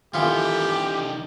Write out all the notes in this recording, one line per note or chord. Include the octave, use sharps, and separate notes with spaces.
D#3 E3 B3 F4 G4 A4